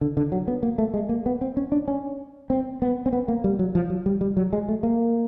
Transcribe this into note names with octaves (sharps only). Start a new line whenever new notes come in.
D3
D3
F#3
B3
A#3
A3
G#3
A#3
B3
C4
C#4
D4
C#4
C4
B3
C4
B3
A#3
G3
F#3
F3
F#3
G3
G3
F#3
G#3
A3
A#3